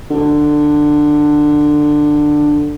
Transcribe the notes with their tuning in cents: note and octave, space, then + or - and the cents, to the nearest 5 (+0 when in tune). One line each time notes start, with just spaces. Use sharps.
D3 +15